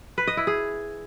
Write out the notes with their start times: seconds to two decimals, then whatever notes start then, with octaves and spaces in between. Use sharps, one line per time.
0.18 B4
0.27 D#5
0.37 E4
0.47 G#4